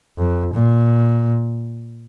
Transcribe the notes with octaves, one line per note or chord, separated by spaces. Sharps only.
F2
A#2